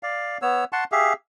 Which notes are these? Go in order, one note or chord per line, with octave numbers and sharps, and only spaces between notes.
D5 F5
B3 C#5 E6
F#5 A5 C6 C#6
G4 G#4 E5 F5